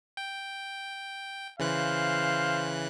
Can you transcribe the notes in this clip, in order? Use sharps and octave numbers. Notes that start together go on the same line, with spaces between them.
G5
C#3 E3 C5 F5 F#6